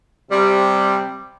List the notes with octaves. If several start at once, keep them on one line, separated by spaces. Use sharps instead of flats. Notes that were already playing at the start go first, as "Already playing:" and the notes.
C3 G3